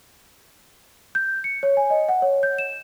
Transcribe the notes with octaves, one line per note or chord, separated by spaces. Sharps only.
G6
C#7
C#5
G#5
D#5
F#5
C#5
G6
E7